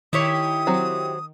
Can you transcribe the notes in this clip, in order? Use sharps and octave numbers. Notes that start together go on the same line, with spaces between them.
D#3 E4 G4 C#5 D#6
F#3 C4